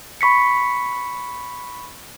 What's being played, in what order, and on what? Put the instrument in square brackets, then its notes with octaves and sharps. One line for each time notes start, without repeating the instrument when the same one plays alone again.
[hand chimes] B5 C#6 B6 C#7